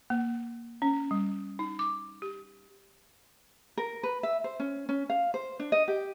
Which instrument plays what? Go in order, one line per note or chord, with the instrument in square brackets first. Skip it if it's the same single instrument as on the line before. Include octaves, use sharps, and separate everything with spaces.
[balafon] A#3
C#4
G3
D#4
D6
G4
[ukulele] A#4
B4
E5
C5
C#4
C#4
F5
C5
D4
D#5
G4